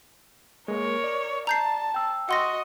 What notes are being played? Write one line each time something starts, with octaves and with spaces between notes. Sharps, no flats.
G#3 A#3 A#4 C#5
D5
A5 A#5 G6 C7
G5 E6
F#4 D#5 F#5 C6 A#6